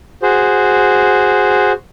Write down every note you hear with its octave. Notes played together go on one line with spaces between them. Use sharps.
F#4 G#4 C5